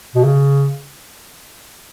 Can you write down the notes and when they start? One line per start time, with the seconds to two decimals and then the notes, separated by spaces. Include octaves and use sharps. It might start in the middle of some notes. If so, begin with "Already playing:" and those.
0.15 B2
0.24 C#3